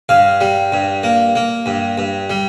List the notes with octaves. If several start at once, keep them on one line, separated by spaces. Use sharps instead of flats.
G2 F5
G3
G2
A#3
A#3
G2
G2
G3